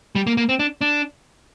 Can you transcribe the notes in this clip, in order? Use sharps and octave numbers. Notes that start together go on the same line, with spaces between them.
G3
A#3
A#3
C4
D4
D4